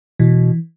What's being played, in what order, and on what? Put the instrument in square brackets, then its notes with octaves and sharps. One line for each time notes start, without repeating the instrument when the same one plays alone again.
[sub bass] B2 [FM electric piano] E3